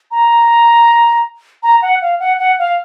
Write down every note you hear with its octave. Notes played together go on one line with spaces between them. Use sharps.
A#5
A#5
F#5
F5
F#5
F#5
F5